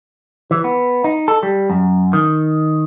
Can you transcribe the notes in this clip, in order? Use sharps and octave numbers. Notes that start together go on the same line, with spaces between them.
E3
B3
D#4
A4
G3
F#2
D#3